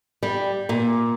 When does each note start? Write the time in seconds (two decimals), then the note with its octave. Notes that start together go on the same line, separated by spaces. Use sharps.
0.23 G3
0.69 A#2